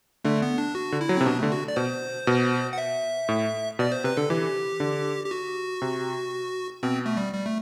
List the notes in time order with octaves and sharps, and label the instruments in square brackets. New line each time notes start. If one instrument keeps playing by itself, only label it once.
[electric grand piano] D3 [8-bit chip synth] A3
[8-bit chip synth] B3
D4
F#4
[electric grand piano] D3
[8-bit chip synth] E4
[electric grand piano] F#3
[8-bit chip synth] C4
[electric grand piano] C3
[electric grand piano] B2 [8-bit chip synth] D4
[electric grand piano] D3 [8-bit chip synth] A3
[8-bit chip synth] F#4
D5
[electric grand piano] B2 [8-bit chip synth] C5
[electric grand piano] B2
[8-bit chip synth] F#5
E5
[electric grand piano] A2
[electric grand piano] B2 [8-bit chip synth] D5
[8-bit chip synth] C5
[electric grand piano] C3 [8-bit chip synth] B4
[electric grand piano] D3 [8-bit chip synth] A4
[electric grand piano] E3 [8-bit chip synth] G4
[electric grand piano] D3
[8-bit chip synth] G4
F#4
[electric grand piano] C3
[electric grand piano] B2 [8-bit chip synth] C4
[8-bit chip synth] A3
G3
G3
A3